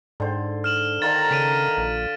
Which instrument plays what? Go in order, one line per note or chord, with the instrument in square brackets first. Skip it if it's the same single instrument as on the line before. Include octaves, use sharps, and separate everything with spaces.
[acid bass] G#2 [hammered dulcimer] D3 C5
[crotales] F6 E7 F#7
[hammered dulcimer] D3 F4 [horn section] D#3 A#5 [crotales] A6
[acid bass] C#3 [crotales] B6 D7 D#7
[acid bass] A#1